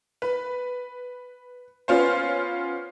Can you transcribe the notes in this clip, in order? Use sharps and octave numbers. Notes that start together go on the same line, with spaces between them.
B4
B3 C#4 F4 C5